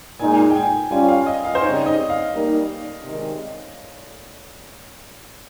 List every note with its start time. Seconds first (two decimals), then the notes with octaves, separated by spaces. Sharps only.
0.19 A#2 G#3 D#4 G#5
0.50 G5
0.56 G#5
0.91 G3 C#4 F4 G#5
1.08 F5
1.26 D#5
1.45 F5
1.55 C5
1.62 C#3 G3 C4 D#4 C#5
1.86 D#5
2.10 F5
2.34 G3 A#3 D#4
3.04 C3 D#3 G#3 D#4